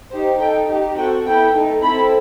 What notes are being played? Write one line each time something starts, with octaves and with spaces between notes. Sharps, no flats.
D#4 G4 C5
D#4 A4 G5
D#4 G4
C4 F#4 A4 G5
B3 E4 A4 G5
A3 D#4 A4
C4 E4 A4 B5